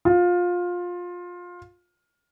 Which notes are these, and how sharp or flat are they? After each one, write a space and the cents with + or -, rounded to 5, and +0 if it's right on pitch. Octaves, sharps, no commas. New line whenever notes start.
F4 +20